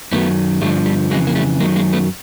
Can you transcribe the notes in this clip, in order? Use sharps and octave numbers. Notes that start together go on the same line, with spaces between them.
F#2 D#3 F#3 A3 B3
G2 D3 F3 G3 A3
G3
F2 C#3 E3 F#3 G#3
A#3
G3 A3
F#2 D#3 F#3 G#3 A#3
G#3 A#3
A3 B3